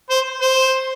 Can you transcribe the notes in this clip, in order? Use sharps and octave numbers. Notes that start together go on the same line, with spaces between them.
C5
C5